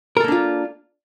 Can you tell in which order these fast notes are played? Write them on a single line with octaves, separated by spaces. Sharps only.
A#4 A4 A#3 D4 F4